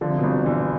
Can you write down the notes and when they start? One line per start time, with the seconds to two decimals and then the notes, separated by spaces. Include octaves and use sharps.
0.01 D3 F3
0.09 C3
0.18 B2
0.23 G1 C3
0.46 G2 E3